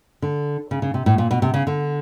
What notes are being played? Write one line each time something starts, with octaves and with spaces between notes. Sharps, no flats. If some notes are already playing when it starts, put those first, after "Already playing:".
D3
C#3
C#3
C3
A2
A#2
B2
C3
C#3
D3